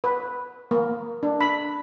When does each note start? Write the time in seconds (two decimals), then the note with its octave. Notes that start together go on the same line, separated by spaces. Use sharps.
0.04 B4
0.71 A#3
1.23 D4
1.41 B5